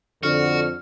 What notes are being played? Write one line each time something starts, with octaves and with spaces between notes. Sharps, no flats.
F2 D3 F#4 F6